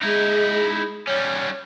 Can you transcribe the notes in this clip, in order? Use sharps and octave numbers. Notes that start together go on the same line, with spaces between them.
G#3 D#4 E4
G3 C#4 C#5